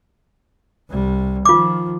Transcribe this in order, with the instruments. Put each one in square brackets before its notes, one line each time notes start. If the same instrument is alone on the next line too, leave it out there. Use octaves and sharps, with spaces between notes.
[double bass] C2 G3
[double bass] D#3 F3 [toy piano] F4 D6